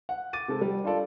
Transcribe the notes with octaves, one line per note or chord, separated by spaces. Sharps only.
F#5
D6 A6 D#7
C3 G#3 C4 A4
G3
D4 F4 G4 A4 D5